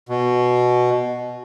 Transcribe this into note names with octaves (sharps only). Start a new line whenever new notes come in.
B2